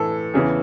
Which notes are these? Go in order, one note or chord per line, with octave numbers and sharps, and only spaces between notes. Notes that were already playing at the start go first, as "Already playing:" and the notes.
Already playing: A2 E3 A4
E2 C#3 E3